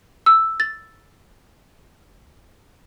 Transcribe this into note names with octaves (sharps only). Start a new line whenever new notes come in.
E6
A6